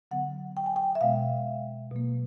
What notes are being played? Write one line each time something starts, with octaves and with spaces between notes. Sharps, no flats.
D3 F#3 B3 F#5
G5
G#5
G5
E5
B2 G#3 B3 F5
B2 F#3 A#3